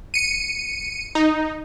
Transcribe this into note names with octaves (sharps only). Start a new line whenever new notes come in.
C#7 D#7
D#4